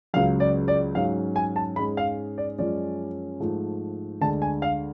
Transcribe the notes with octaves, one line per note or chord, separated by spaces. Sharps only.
C#2 C#3 F#3 F5
D5
D5
G#2 F#3 C#4 F5
G#5
A5
G#2 G#3 C#4 B5
F5
D5
F#2 F3 G#3 C#4 D5
G#2 F3 A3
D2 D3 G#3 A5
G#5
F5